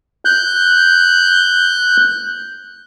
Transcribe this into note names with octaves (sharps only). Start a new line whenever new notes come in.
F#6 G6